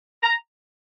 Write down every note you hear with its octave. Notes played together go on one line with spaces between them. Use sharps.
A#5